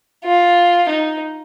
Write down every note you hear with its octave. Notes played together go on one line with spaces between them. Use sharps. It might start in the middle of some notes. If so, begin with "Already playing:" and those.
F4
D#4